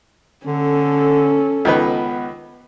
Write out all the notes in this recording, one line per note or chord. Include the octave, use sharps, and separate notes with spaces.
D3 C#4 A4
C#2 D#3 B3 B4